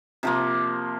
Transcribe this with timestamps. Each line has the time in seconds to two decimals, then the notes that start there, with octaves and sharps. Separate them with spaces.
0.23 C3 F3 A#3